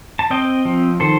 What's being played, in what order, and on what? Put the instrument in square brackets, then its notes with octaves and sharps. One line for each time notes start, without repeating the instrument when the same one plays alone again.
[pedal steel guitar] A5
C4 D#5 G5
F3
D#3 A4 C5